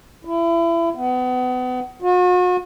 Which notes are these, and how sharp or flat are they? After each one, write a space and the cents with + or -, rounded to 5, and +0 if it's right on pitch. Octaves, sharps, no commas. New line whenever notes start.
E4 +30
B3 +30
F#4 -40